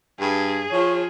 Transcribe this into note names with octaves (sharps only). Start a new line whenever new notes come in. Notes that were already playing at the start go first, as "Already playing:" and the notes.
G2 G#4
F3 C#5